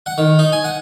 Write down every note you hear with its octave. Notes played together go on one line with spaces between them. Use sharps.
F#5
D#3
D#4
G#5
F#5